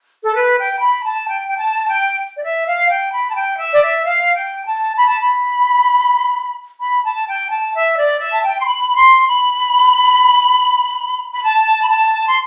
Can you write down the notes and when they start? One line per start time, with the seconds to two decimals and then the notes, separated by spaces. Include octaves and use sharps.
0.24 A4
0.35 B4
0.58 G5
0.81 B5
1.04 A5
1.28 G5
1.48 G5
1.58 A5
1.89 G5
2.36 D5
2.43 E5
2.66 F5
2.89 G5
3.12 B5
3.29 A5
3.35 G5
3.58 E5
3.73 D5
3.81 E5
4.04 F5
4.35 G5
4.66 A5
4.97 B5
5.08 A5
5.20 B5
6.81 B5
7.04 A5
7.27 G5
7.50 A5
7.74 E5
7.97 D5
8.19 E5
8.33 A5
8.43 G5
8.61 C6
8.66 B5
8.90 B5
8.97 C6
9.28 B5
11.34 B5
11.43 A5
11.83 B5
11.89 A5
12.28 C6